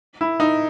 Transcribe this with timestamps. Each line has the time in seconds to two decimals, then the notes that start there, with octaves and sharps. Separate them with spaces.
0.21 E4
0.40 D#4